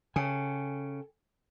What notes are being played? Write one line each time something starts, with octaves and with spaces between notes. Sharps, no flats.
C#3 A4 G5 G#5